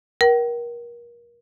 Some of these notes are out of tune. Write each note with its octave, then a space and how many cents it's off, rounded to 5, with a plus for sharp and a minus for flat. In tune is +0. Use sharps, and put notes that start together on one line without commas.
A#4 +30 G5 -40